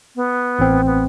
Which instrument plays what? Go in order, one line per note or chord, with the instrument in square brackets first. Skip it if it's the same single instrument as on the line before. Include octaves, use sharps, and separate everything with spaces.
[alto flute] B3
[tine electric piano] A1 C4
[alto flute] B3